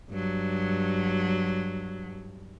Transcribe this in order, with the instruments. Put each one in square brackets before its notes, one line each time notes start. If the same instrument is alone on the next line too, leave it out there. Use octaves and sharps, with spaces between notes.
[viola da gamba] G2 F#3